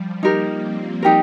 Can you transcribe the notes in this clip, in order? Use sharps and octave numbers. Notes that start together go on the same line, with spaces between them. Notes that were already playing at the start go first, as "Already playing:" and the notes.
Already playing: F3 G3
A#3 D#4 G4 A#4
C4
D#4 G4 A#4